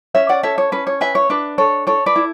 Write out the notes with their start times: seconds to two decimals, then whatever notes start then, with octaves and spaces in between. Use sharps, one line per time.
0.15 C#4 C#5 E5
0.29 D5 F#5
0.43 A4 C#5 E5
0.58 C#5
0.72 C#4 B4
0.87 C#5
1.01 B4 E5 G#5
1.15 C#5
1.30 D4 B4
1.58 A4 C#5
1.87 A4 C#5
2.06 B4 D5
2.16 E4